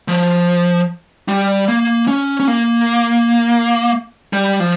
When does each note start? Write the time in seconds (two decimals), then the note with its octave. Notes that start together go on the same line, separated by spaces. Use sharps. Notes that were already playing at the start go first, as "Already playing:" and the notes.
0.08 F3
1.28 G3
1.68 A#3
2.08 C#4
2.40 C#4
2.48 A#3
4.33 G3
4.60 F3